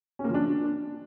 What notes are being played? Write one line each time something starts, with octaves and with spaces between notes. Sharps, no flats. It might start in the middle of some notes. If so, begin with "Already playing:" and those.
C#4
A#3
F3
D4